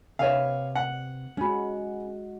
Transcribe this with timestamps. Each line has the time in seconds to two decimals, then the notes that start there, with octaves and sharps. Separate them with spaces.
0.19 C3 B4 C#5 E5 F5
0.75 F#5
1.37 G#3 C#4 F#4 B5